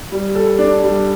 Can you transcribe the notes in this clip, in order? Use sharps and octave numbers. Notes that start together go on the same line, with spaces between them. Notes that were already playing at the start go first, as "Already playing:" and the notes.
G3
A4
D4
G3